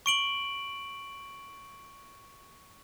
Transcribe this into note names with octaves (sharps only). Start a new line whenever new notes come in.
C#6 D7 F#7